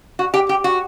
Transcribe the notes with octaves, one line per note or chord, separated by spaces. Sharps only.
F#4
G4
G4
F#4